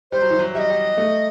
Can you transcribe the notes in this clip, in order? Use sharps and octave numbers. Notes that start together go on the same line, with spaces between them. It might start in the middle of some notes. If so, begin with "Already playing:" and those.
G3 C5
F#3
E3
F#3
G3 D#5 E5
G3
A3